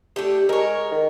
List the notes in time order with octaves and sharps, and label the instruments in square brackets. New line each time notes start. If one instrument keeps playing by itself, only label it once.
[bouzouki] A3 D4 G4
[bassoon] G#3 [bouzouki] A#4 C#5
[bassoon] D#3